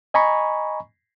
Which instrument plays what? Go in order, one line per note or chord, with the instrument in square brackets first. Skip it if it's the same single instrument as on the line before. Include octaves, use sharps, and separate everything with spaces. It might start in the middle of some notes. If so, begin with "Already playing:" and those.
[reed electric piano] D#5 G#5 A#5 B5 C#6